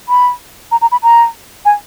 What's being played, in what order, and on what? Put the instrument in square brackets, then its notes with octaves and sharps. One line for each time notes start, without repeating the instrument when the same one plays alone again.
[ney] B5
A#5
A#5
B5
A#5
G#5